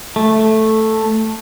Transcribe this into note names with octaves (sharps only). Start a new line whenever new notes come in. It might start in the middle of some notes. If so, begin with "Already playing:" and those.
A3